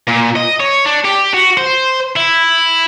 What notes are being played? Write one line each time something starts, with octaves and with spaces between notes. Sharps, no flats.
A#2
D#5
C#5
D4
G4
F#4
C5
E4